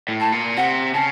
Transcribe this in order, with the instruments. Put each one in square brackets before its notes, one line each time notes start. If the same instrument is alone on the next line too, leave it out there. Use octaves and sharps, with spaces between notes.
[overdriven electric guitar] A2
[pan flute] A5
[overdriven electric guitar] A#2
[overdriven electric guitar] C3 [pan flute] F#5
[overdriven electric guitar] C#3 [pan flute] A5